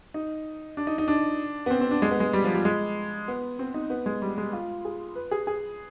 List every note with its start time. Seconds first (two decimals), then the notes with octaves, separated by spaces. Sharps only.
0.14 D#4
0.77 D4
0.87 D#4
0.98 D#4
1.08 D4
1.66 B3
1.71 C4
1.81 C4
1.91 D4
2.02 G#3
2.11 B3
2.20 G#3
2.33 G3
2.44 F3
2.55 G3
2.65 G#3
3.28 B3
3.59 C4
3.74 D#4
3.90 B3
4.06 G#3
4.22 G3
4.38 G#3
4.53 F4
4.85 G#4
5.15 B4
5.31 G#4
5.47 G#4